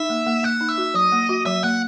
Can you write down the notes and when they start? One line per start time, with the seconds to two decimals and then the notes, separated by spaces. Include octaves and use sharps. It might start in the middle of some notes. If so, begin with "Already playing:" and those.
Already playing: D#4 E5
0.10 A#3
0.27 A#3
0.43 A#3 F#5
0.61 D#4
0.69 E5
0.78 F#4
0.94 F#3 D#5
1.12 A#3
1.29 F#4
1.46 F#3 E5
1.63 A#3 F#5